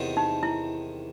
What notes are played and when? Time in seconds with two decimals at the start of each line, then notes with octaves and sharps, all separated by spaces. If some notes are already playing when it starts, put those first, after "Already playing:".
Already playing: E2 C3 D#3
0.17 D#4
0.43 E4